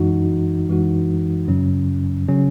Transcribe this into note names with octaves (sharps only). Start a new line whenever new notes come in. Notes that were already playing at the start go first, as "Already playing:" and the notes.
Already playing: F#2 E3 G#3 D#4 F#4
F#2 E3 G#3 D#4 F#4
F#2 C#3 F#3 C#4
C#3 F#3 C#4